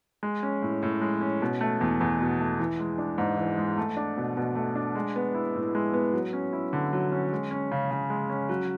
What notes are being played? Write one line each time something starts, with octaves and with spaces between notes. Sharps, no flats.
G#3
C#4
A2
A2
G#3
C#4
B2
A3
E2
E2
B2
A3
E3
G#3
D4
G#2
E3
G#3
A3
D4
B2
B2
A3
D4
G#3
B3
E4
A2
G#3
B3
F#3
C#4
E4
D3
F#3
C#4
G#3
C#4
C#3
C#3
G#3
C#4
F#3